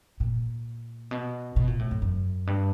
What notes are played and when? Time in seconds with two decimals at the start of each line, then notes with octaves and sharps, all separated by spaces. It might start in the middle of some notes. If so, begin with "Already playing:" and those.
0.20 A#2
1.11 B2
1.56 B2
1.67 A#2
1.79 A2
1.91 F2
2.02 F#2
2.47 G2